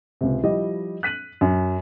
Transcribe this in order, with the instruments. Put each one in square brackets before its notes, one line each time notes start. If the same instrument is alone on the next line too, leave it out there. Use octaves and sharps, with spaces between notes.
[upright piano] C#2 C3
F3 G3 E4 G4 D#5
F#6 B6 D#7 F#7
F#2